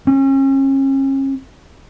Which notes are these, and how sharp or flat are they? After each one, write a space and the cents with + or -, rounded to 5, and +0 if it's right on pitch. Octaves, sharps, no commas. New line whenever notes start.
C#4 -35